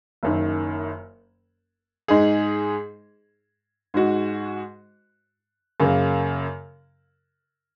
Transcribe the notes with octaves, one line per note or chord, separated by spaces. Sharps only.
F#1 F#2 D#3
G#2 G#3 D#4 G#4
G#2 G#3 F#4
F#2 C#3 A#3